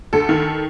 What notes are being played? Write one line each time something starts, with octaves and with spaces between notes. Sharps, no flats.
D2 A4
D#3